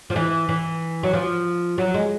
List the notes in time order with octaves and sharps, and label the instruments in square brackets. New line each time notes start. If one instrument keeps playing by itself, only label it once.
[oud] F3
E3
E3
F#3
F3
F#3
G#3